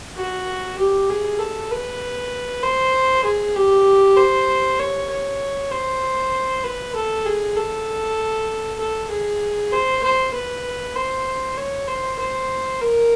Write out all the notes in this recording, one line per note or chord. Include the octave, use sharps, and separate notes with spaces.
F#4
G4
G#4
A4
B4
C5
G#4
G4
C5
C#5
C#5
C5
B4
A4
G#4
A4
A4
G#4
C5
C5
B4
C5
C#5
C5
C5
A#4